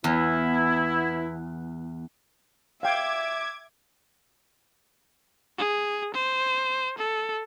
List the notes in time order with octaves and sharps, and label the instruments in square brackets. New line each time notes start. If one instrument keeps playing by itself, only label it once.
[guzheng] E2 [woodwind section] E3 B3 E4
[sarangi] E5 [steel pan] F5 G5 [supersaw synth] D6 G#6
[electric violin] G#4
C5
A4